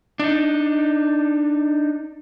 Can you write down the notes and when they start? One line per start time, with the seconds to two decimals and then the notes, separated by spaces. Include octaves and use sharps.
0.20 D4 D#4